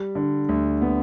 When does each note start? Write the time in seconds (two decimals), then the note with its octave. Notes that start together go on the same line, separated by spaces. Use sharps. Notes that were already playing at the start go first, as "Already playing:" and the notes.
Already playing: G3
0.15 D3
0.49 D2
0.82 B3